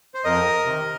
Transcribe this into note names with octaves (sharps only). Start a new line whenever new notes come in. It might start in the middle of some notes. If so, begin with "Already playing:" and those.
C5
F2 A#4 D#5
C3 D#3